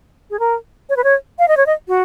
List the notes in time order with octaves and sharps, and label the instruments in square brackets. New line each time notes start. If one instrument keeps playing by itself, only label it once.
[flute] G#4
A#4
C#5
B4
C#5
F5
D#5
C#5
D#5
F#4